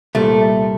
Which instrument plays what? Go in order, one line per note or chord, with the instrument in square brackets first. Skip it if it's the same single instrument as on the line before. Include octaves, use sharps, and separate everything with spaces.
[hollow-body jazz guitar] C2 A#2 G3 [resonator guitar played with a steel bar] A3